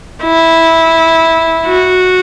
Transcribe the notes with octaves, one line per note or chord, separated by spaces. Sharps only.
E4
F#4